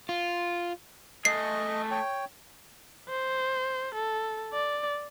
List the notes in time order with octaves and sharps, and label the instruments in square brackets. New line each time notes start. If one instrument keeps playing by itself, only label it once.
[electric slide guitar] F4
[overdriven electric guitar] A3 G#4 [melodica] D#5 [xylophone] C7
[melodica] C#5 G5
[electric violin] C5
A4
D5